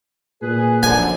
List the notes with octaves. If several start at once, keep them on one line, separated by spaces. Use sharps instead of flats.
A#2 G#4 B4
F#2 D3 F3 G#5